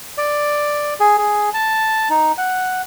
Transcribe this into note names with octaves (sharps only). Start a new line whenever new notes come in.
D5
G#4
G#4
A5
D#4
F#5